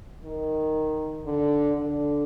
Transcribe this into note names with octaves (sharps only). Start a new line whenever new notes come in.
D#3
D3
D3